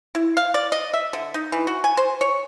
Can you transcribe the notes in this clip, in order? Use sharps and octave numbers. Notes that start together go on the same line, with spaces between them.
E4
F5
D5
D#5
E5
D3
D#4
E3
F#4
G#5
C5
C#5